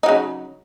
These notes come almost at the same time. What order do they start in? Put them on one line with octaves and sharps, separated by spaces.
D#4 F#3 C#3